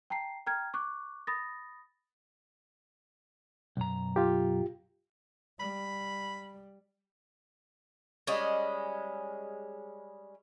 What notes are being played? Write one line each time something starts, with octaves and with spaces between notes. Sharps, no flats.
G5 A5 A#5 C7
G5 A#5 F6 G#6
C#6 D6 F#6
B5 D#6 A6 A#6
B1 F#2 A#5
F4 G4
G3 B5
G3 G#3 C#4 D#5